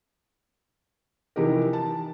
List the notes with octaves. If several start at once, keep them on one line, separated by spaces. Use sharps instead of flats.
C3 E3 F3 D#4 G4 A#4
A5